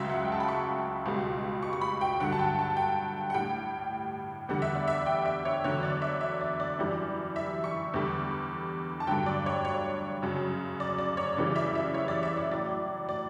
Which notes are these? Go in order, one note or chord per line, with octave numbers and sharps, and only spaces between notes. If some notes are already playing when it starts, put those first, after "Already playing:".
Already playing: C#2 C#3 F#3 E5
F#5
G5
A5
B5
C#6
C#2 B2 G3
C#6
C#6
B5
G5
G2 D3 F#3 F#5
A5
G5
A5
G5
F#5
A2 G3 G5
E2 D3 G3 F#5
E5
D5
E5
G5
E5
C#5
E2 D3 F#3 C#5
D5
E5
E5
D5
D5
F#2 E3 G3
E5
C#6
E2 D3 G3
A5
G2 D3 F#3 G5
D5
C#5
C#5
F#2 C#3 F#3
D5
D5
C#5
F#2 C#3 E3 G3 D5
E5
E5
C#5
D5
E5
D5
A2 F#3 D5
D5